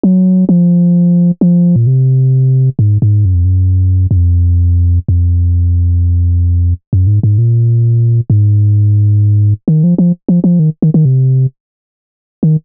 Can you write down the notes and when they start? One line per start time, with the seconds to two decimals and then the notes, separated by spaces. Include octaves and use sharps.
0.03 F#3
0.49 F3
1.41 F3
1.76 A#2
1.87 C3
2.79 G#2
3.02 G#2
3.25 F#2
3.34 F2
3.45 F#2
4.11 F#2
4.17 F2
5.08 F2
6.93 F#2
7.07 G#2
7.23 G#2
7.38 A#2
8.30 G#2
9.68 D#3
9.84 F3
9.98 F3
10.29 F3
10.44 F3
10.59 D#3
10.82 D#3
10.94 D#3
11.05 C3
12.43 D#3